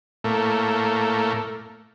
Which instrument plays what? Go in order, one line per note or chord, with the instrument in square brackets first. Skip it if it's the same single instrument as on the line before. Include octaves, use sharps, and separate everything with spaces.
[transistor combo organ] A2 A3 A#3